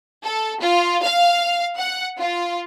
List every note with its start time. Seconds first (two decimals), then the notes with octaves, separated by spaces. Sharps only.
0.24 A4
0.61 F4
1.02 F5
1.78 F#5
2.19 F4